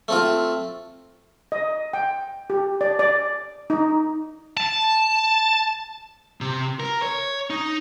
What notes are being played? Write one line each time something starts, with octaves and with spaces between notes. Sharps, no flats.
A3 C4 F4
D#5
G5
G4
D5
D5
D#4
A5
C3
A#4
C#5
D#4